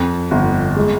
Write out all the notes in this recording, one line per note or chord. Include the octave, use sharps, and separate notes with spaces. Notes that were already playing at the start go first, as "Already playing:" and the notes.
Already playing: F2
G1
G#3